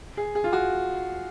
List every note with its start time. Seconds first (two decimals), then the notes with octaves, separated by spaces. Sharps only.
0.17 G#4
0.35 G#4
0.44 F4
0.53 F#4